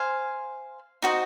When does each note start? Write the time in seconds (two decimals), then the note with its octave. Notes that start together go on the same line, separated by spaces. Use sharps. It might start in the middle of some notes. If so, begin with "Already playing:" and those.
Already playing: C5 F5 G#5
1.02 D#4 F#4 C5 D#5